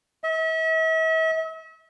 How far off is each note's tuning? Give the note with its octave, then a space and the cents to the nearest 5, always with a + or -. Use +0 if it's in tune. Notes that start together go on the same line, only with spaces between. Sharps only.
E5 -40